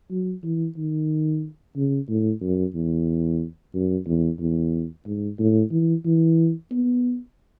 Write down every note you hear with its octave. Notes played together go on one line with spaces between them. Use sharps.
F#3
E3
D#3
C#3
A2
F#2
E2
F#2
E2
E2
G#2
A2
E3
E3
B3